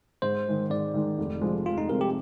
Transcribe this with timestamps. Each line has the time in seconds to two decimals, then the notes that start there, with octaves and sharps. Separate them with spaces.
0.22 G#2 C5
0.46 D#3 G#3 D#4
0.70 G#2 D5
0.94 D#3 G#3 D#4
1.18 F1
1.41 F2 C3 F3 G#3
1.66 F1 F4
1.78 D#4
1.89 F2 C3 F3 G#3 A#4
2.01 G4